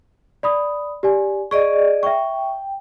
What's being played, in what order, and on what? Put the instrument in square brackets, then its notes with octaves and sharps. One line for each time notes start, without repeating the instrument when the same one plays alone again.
[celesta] D5 B5 D#6
G4 D5 G#5
[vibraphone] G#4 D5 D#5 [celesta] C#6
[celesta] E5 C#6 [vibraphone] G5